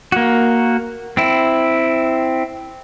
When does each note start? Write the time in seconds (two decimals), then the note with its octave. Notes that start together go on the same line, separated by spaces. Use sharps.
0.12 A#3 F#4
1.17 C4 E4